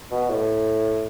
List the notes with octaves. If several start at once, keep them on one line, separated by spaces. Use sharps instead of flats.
B2
A2